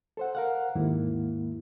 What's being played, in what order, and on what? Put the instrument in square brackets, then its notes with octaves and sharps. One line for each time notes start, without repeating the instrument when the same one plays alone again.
[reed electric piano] A4 C5 F#5
A#4 F5 F#5
D#2 G#2 A#3 E4